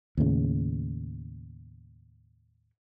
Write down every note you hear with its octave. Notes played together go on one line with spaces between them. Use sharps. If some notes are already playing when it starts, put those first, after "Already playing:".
D#2 A2 C#3